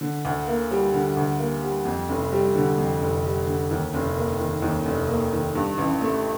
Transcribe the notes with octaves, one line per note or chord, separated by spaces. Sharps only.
D3
D2
A#3
G3
D3
D2
A#3
G3
F2
F1
G3
D3
F2
F1
G3
D3
D#2
F1
A#3
D#3
D#2
F1
A#3
D#3
G2
A1
A3